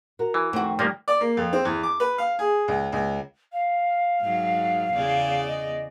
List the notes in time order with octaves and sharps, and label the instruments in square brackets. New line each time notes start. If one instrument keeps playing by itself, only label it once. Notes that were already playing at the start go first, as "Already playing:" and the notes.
[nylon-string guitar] F#4 A#4
[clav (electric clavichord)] E3
[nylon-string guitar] F2 D#3 A3 [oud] C4 F#4
[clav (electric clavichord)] F3 A#3 [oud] G3
[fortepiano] D5
A#3
F2
C4
E2
D6
B4
F5
G#4
C#2
C#2
[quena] F5
[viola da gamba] G#2 F#3
E2 C#3 D5
[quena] D#5